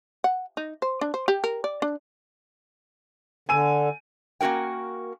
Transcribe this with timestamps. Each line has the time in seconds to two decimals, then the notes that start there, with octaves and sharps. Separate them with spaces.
0.24 F#5
0.57 D#4
0.82 C5
1.01 D4
1.14 C5
1.28 G4
1.44 A#4
1.64 D5
1.82 D4
3.49 D3 G#5 E6 D#7
4.41 A#3 C#4 F#4 A#4 G5